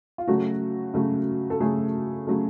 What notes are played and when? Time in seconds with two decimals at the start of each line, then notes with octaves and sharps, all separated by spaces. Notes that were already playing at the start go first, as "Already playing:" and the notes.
0.18 F4
0.28 C#3 F#3 A3 F#4
0.94 C#3 F#3 A3
1.50 A4
1.60 C#3 F#3 A3 G#4
2.27 C#3 F#3 A3